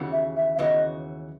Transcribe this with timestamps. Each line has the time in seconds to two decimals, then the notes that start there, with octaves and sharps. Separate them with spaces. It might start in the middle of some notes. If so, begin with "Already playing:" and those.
Already playing: D#2 C#3 E3 B3 F#4
0.12 E5
0.36 E5
0.55 E5
0.59 D#2 C#3 E3 B3 F#4 D#5